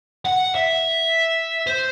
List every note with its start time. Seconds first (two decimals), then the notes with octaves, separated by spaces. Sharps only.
0.25 F#5
0.55 E5
1.67 C5